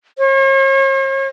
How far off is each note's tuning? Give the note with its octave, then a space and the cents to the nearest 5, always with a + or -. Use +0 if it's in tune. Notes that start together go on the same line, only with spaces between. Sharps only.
C#5 -45